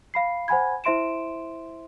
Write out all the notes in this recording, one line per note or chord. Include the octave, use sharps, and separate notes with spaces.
F5 B5 C7
C5 F#5 G#5 B5 G#6
E4 C5 E5 C6 D7 E7